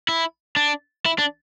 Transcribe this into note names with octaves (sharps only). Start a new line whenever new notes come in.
E4
D4
E4
D4